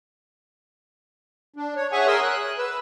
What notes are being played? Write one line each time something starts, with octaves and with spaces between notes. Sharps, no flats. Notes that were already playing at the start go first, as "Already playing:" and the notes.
D4
C#5
G#4 C#5 E5 F#5 G#5 C#6
G#4 A#4 G#5 C6 D#6 E6
F#6
B4 E6